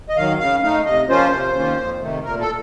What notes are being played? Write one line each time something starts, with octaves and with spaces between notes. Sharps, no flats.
D#5
D#3 F#3 F5
C#3 F5
A3 D#4 F5
C3 D#5
F3 A#3 C#4 F4 C5
C3
D#3 A#3 C#4 F4
F2
C3 D#3 A3
A#2 A#4
A4